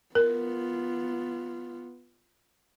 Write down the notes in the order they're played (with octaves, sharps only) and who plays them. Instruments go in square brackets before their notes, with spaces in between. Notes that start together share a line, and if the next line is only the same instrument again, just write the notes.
[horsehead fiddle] B3 F4 [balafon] A#4